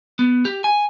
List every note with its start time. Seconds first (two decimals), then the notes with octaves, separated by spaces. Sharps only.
0.19 B3
0.45 G4
0.64 G#5